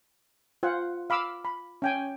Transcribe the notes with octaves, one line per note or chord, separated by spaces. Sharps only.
F4 C5 F#5
F5 B5 D6 E6
B5
C#4 G5 G#5